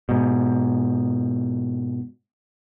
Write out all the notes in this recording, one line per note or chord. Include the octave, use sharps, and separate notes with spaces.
G#2 B2